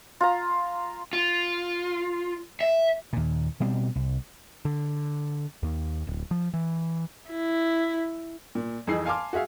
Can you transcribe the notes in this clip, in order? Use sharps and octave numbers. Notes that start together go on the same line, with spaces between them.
F4 A#5
F4
E5
D#2 A#2
B2 G3 C4
C2
D3
D#2
D1
F3
E3
E4
A#2
F2 E3 D#4 G#4 E6 C7
F5 G#5 A5 C6 D6 F6
F#4 G#4 E5 F5